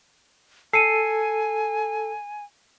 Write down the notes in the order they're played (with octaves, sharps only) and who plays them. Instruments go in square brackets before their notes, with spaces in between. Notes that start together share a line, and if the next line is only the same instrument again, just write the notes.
[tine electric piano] A4 [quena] G#5 [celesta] C7 C#7 D#7